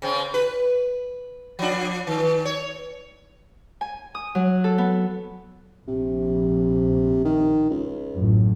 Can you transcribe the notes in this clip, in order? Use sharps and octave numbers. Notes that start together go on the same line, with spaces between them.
C#3 C4
B4
F3 D4
D#3
C#5
G#5
D#6
F#3
A4
B3
A#1 C3
D#3
C#2
A1 F#2 A2